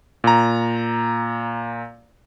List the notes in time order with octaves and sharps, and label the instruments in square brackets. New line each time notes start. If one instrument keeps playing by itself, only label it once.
[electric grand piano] A#2 A#5